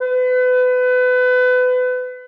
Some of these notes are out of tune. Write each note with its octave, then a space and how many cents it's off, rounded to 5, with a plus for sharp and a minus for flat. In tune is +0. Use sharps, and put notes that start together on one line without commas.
B4 +30